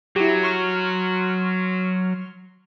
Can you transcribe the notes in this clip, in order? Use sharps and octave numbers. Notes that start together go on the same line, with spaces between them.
F#3 E4 G4
C6 C#6 F6